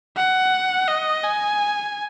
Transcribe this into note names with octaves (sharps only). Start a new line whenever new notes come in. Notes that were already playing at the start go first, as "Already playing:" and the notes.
F#5
D#5
G#5